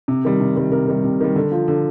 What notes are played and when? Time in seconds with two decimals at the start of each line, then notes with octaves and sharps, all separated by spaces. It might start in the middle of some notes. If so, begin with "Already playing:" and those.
0.08 C3
0.25 D#3 G3
0.40 C3
0.56 D#3 G3
0.72 C3 A#4
0.88 D#3 G3
1.04 C3
1.20 D#3 G3
1.36 D3
1.52 F3
1.68 D3